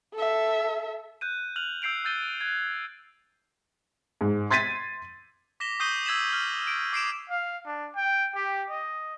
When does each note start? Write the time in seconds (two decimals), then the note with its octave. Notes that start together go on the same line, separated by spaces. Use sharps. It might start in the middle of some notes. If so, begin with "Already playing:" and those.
0.14 A4 E5
1.21 F#6 G6 D#7
1.56 F6 F#6 F7 F#7
1.82 E6 G6 C7 D7 F7
2.05 E6 G6 A6 D#7 G7
2.41 F#6 G#6
4.21 G#2
4.50 C6 G#6 A6 B6 D#7
5.60 D6 A#6 B6 E7 G7
5.80 C#6 D#6 G6 C7 D#7 G7
6.05 E6 G#6 B6 E7 F#7
6.33 F6
6.67 D7
6.93 D6 C7 D7 E7
7.30 F5
7.66 D4
7.95 G5
8.35 G4
8.70 D#5